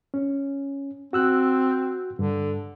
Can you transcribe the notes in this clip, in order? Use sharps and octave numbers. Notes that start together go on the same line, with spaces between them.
C#4
C4 F#4 E6 F#6
G2 D3